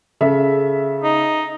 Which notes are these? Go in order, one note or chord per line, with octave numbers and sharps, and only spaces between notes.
C#3 A4 E5
D#4